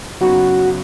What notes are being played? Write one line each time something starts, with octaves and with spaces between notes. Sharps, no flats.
F#2 C#3 F#3 B3 D#4 F#4